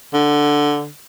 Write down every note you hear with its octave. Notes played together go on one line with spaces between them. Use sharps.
D3